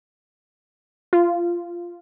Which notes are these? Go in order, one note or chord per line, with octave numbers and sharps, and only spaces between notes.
F4